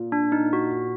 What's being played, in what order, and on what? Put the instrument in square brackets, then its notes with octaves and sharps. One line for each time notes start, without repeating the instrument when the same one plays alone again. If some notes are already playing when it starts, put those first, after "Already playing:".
Already playing: [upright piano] A#2
[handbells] D4
D#4
F#4